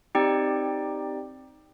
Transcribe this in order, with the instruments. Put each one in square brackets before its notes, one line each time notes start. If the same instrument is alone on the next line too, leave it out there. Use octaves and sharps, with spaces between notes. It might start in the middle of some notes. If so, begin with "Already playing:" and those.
[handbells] C4 D#4 G4 D5 G5